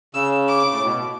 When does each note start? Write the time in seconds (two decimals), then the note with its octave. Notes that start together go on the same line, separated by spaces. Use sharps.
0.14 C#3 E6
0.49 D6
0.71 A2
0.84 B2